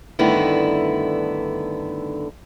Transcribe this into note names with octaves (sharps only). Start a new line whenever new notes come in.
G2 D3 D#3 A3 B3 E4